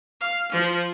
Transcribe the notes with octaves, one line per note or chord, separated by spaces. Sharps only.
F5
F3